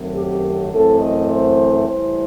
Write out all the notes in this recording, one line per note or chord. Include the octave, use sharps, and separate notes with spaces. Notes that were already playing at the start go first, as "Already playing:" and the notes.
Already playing: F#2 D#3 F#3 A3 C4
G4
F#2 E3 A3 C4 A4
D#5
C5
A2 E3 G3 C5